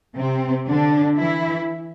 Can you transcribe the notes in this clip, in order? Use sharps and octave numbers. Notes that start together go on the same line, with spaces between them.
C3 C4
D3 D4
E3 E4